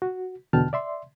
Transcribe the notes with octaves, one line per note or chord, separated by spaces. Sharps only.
F#4
E2 B2 D3 G5 A5 F6
D5 E5 C6